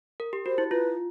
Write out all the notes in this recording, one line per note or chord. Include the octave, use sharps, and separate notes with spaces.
A#4
G4
F#4 C5
E4
F4 B4